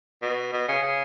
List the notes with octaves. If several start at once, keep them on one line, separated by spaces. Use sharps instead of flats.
B2
B2
C#3
C#3